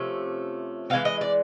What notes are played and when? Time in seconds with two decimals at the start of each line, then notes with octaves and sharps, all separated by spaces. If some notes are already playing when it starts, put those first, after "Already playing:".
Already playing: C3 F3 A3 C#4
0.90 E3 G#3 C4 F5
1.05 D#5
1.21 D5